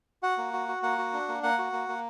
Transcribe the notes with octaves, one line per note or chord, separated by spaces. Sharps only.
F#4 F#5
A#3
F#4
F#4
A#3 F#5
F#4
D4
A#3
A#3 F#5
F#4
A#3
A#3